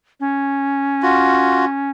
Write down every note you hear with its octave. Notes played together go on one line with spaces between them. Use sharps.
C#4
F4 F#4